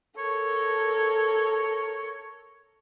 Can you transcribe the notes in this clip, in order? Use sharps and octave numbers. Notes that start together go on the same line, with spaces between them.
A4 A#4 C#5